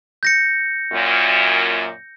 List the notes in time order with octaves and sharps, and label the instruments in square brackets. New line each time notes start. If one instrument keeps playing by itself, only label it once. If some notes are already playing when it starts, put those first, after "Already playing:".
[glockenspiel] G6 A#6 C#7
[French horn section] F#2 A#2